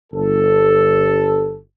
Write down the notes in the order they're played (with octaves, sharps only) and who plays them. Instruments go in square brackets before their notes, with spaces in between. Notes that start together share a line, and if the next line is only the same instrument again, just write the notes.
[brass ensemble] G1 A4